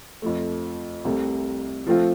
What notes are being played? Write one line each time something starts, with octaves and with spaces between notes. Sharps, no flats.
F2 F3 A3
C2 C3 A3
F3 A3 C4 F4